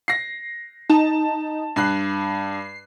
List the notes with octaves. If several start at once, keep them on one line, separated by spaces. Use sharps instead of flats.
A#6 C7
D#4 A5
G2 F#6 C7